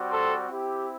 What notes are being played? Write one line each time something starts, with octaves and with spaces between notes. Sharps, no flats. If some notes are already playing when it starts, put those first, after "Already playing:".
Already playing: G3 C4 F#4
A4 C5
C4 E4 G4